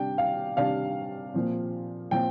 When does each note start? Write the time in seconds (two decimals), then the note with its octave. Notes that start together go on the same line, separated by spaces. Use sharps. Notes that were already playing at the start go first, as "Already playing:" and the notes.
Already playing: C3 G3 D4 G5
0.18 F5
0.57 C3 G3 D4 F5
1.34 A#2 F3 C4
2.11 A#2 F3 C4 G5